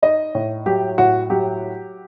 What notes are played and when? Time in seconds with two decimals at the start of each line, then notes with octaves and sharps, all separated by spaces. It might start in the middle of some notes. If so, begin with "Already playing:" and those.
0.02 D#4 D#5
0.35 A2
0.66 F#3 G4
0.98 A2 F#4
1.30 F#3 G4